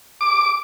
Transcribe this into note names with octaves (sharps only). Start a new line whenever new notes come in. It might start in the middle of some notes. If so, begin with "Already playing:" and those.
D6